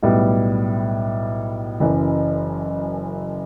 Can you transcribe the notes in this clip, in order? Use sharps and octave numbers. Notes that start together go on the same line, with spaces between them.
B1 A2 G3 B3
F#1 F#2 E3